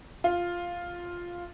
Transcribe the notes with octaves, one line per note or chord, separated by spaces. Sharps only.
F4